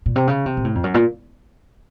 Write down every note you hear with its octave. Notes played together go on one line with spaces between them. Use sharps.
A#2
C3
C#3
C3
A#2
A2
F2
F#2
A#2